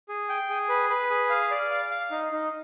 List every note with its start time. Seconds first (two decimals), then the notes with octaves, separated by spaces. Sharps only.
0.09 G#4
0.29 G5
0.50 G#4
0.69 B4
0.90 B4
1.10 G#4
1.30 F5
1.51 D5
1.71 F5
1.90 F5
2.11 D#4
2.32 D#4